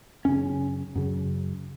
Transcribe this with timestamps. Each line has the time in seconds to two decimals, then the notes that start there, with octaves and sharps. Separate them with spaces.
0.25 F#2 C#3 C#4
0.95 F#2 C#3